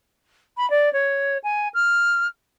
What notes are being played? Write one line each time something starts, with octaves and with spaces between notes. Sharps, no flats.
B5
D5
C#5
G#5
F6